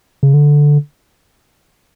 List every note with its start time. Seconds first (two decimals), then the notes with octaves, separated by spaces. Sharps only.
0.23 C#3
0.34 D3